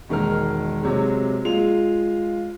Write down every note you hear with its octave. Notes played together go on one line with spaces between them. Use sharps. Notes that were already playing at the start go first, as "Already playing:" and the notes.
E1 D#3 G#3 A#4 F6
C3 F#3 G#3
G#3 F4 F7